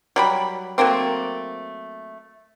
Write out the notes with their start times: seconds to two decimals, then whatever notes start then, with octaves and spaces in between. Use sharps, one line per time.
0.16 F#3 G3 B5
0.78 F#3 A3 A#3 C4